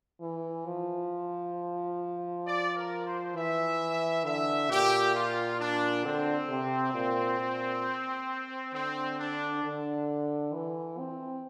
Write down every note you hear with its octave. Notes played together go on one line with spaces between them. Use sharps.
E3
F3
D5
A#4
C5
E3 E5
D3 E5
A#2 G4
F4
D4
D3 C4
C3
A#2
A#2
D3 C4
D4
D3
E3
C4